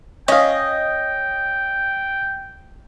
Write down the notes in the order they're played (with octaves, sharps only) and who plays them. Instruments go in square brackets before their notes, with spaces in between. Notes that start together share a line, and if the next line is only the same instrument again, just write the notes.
[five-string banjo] C#4 F5 [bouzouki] D#5 [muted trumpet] G5